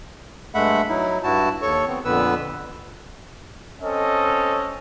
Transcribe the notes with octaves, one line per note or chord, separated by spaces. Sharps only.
G2 G#3 A3 E5 F#5 B5
F#3 D#4 E4
G2 E4 F#4 A5
D#2 A4 C#5 C#6
B3 C4
F2 A#2 D3 B3 B4 E6
C4 C#4 A4 D#5